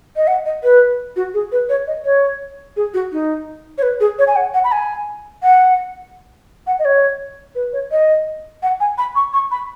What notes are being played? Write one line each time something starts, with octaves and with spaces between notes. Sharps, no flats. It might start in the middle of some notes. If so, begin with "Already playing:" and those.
D#5
F#5
D#5
B4
F#4
G#4
B4
C#5
D#5
C#5
G#4
F#4
D#4
C#5
B4
G#4
C#5
G#5
F#5
F#5
B5
G#5
F#5
F#5
D#5
C#5
B4
C#5
D#5
F#5
G#5
B5
C#6
C#6
B5